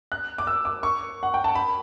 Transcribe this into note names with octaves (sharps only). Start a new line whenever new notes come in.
F#6
D6
E6
D6
C#6
F#5
G5
A5
B5